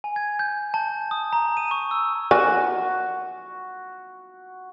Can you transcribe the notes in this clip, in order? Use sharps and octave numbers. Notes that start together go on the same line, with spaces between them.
G#5
G#6
G6
A5
D#6
A#5
D#7
C#6
E6
F#4 A#4 D5 G#5